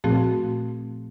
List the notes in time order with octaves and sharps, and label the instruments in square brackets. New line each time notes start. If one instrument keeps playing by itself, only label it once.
[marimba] A#2 F3 A3 C4 F#4 G#4